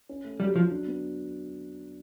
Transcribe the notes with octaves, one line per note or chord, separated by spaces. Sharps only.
C#4
A3
F#3 G3
F3 F#3
D4
B3